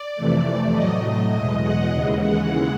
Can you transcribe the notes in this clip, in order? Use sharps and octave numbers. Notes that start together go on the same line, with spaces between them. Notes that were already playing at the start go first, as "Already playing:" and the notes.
Already playing: D5
F2 C3 E3 A3
A2 F#3 A3 D#5
E2 B2 G#3
F#5
D#2 C#3 E3 G#3
F#5